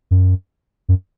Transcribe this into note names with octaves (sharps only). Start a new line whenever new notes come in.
F#2
F#2